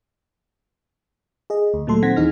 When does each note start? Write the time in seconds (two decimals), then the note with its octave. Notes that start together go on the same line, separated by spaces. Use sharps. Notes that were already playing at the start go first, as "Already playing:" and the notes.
1.50 G#4 D#5
1.74 D2
1.87 A#2 F#3 A3 A4 C6
2.03 D#3 C4 F#5 G#6 A#6 B6
2.16 D#2 E3 D#4 G#4 F6 A#6